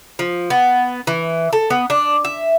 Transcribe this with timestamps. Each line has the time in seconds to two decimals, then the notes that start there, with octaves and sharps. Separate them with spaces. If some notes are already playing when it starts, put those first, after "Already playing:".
0.19 F3
0.50 B3
1.07 E3
1.53 A4
1.70 B3
1.90 D4
2.25 E5